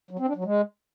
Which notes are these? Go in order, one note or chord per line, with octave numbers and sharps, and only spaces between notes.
F#3
C4
D4
F#3
G#3